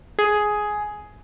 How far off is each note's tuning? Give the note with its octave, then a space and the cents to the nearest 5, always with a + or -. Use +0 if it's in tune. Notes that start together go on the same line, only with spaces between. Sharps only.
G#4 +10